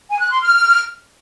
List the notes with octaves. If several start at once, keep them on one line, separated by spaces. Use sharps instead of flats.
G#5
F#6
C6
F6